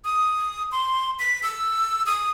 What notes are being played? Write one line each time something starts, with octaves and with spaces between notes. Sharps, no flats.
D#6
C6
B6
E6
D#6